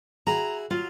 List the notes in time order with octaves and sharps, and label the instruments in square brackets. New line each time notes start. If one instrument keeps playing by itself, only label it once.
[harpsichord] E4 F#4 G#4 [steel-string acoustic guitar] A#5
[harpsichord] F#3 [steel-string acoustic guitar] F4